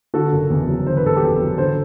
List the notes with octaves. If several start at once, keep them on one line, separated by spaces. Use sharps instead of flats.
D3 F#4 A4
F#1
E2
F#3
D3 C5
B4
F#1 A4
G4 B4
E2
F#3
D3 A4 C5